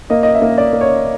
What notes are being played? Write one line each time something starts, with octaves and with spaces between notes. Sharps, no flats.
A#3 D#5
D#5
E5
A#3
D5
A#3
C#5